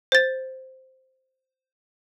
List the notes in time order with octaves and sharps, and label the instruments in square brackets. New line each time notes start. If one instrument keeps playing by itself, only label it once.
[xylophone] C5 A6